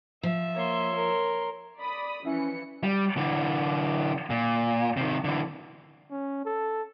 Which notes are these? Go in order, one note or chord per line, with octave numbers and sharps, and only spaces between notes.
F3 E5
A#3 C#5 C6
A#4
D5 B5 D#6
E3 F3 C#4 E4 C#7
G3
D3 E3
A#2
C3 D#3
D3 E3
C#4
A4